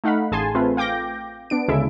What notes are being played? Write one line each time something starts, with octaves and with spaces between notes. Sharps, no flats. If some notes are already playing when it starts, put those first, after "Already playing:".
A3 D#4 F5 F#5 B5
A1 G#4 G#5 A5 C6
A3 C4 F4 B4
F5 G5 D6 G6 A#6
B3 D4 D7
D2 C#3 G#3 E4 A4 E5